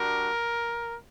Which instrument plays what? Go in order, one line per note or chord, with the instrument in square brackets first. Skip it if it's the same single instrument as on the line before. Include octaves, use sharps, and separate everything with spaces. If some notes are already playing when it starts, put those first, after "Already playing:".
Already playing: [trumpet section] G3 D4 F#4 A#4